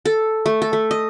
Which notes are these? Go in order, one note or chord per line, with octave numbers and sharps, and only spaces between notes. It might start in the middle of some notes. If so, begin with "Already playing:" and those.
A4
A3
A4
A3
D#5